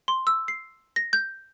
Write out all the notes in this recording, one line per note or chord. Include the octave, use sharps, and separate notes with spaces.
C6
E6
C7
A#6
G6